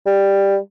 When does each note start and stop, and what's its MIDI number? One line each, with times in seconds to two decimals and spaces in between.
0.06 0.57 55